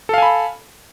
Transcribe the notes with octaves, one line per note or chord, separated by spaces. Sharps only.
A4 F5 G#5 B5